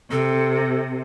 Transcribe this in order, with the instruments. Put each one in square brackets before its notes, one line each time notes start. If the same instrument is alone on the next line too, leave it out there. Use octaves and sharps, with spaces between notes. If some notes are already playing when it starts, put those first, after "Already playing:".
[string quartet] C3 [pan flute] A4